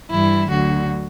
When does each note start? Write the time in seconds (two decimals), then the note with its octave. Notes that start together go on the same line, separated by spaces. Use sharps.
0.09 G2 E3 G3 E4
0.49 D2 D3 F#3 F#4